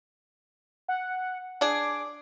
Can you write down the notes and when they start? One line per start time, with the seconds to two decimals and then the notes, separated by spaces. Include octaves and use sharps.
0.88 F#5
1.61 D4 G#4 D6